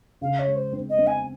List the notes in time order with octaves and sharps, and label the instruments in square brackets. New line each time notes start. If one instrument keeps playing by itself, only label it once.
[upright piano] C#3 [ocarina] F5
[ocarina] C#5
[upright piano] G#3
[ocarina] C5
[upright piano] C4
[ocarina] D#5
[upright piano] C4
[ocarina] G#5